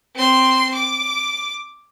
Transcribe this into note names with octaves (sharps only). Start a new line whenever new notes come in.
C4 C6
D6